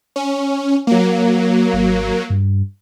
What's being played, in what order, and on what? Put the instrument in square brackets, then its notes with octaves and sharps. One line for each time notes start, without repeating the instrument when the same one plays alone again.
[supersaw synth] C#4
F#3 A#3
[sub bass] G#1
G2